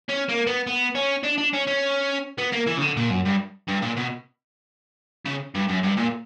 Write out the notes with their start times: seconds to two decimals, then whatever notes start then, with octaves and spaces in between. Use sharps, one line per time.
0.09 C#4
0.29 A#3
0.47 B3
0.67 B3
0.95 C#4
1.23 D4
1.38 D4
1.53 C#4
1.67 C#4
2.38 B3
2.53 A#3
2.67 E3
2.78 C#3
2.82 D3
2.97 A#2
3.10 F#2
3.25 G2
3.68 G2
3.82 A#2
3.96 B2
5.26 C#3
5.55 G2
5.69 F#2
5.83 G2
5.97 A#2